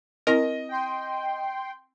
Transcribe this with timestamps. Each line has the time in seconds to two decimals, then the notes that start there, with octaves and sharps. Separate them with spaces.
0.27 C4 E4 A#4 D#5 A#6
0.69 G5 C6